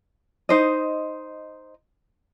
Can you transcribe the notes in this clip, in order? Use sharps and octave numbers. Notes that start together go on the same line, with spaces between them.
D#4 C5 D#5